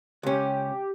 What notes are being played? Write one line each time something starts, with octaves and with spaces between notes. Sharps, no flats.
C#2 C#4 G4